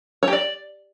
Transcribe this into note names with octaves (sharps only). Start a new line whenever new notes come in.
C#5
G4
D5